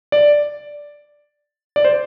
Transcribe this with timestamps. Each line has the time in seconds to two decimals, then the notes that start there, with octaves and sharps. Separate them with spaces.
0.12 D5
1.76 D5
1.85 C5